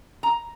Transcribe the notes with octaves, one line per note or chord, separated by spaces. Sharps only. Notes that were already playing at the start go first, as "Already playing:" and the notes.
A#5